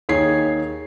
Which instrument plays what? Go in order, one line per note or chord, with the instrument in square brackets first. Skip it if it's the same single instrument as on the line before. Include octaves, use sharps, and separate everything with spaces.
[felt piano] D#2 G#4 C#5 G#6 C7